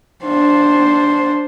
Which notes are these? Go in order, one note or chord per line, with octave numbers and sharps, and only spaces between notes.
D4 C5